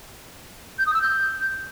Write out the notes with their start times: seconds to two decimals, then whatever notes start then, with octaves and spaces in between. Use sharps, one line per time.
0.79 G6
0.86 D#6
0.94 E6
1.02 G6